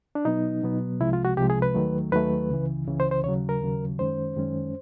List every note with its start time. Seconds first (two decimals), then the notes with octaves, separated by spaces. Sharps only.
0.15 D4
0.25 B2 F#3 B3 D#4
0.63 B2 F#3 B3
1.00 C2 C3 F3 G#3 E4
1.13 F4
1.25 F#4
1.37 C2 C3 F3 G#3 G4
1.50 G#4
1.62 B4
1.74 D#2 D#3 F#3 A3
2.12 D#2 D#3 F#3 A3 B4
2.50 C#2 C#3 E3
2.87 C#2 C#3 E3
3.00 C5
3.11 C5
3.24 D#2 C#3 F#3 C#5
3.49 A#4
3.61 D#2 C#3 F#3
3.98 F#2 D#3 G#3 C#4 C5
4.36 F#2 D#3 G#3 C#4